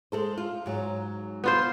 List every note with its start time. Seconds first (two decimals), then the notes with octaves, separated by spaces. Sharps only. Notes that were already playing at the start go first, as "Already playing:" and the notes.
0.12 G#3 A4 C5
0.37 F4
0.66 G#2 F#3
1.44 B3 F4 C5